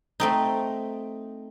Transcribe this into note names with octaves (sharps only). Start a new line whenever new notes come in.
A3 C4 D#4